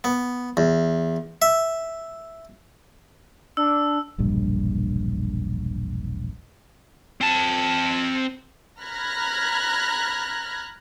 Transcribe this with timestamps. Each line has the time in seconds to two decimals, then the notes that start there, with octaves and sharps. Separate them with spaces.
0.04 B3
0.57 E2
1.42 E5
3.57 D4 E6
4.18 E1 A#1 G2
7.21 C4 A5
8.81 A#5 B5 F6 F#6 G#6 A#6